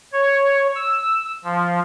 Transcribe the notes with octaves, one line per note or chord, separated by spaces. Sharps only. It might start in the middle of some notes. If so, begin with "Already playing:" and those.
C#5
E6
F3